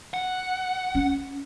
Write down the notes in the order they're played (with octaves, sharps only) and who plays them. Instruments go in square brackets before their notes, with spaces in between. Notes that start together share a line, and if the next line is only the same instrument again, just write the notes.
[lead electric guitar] F#5
[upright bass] C#4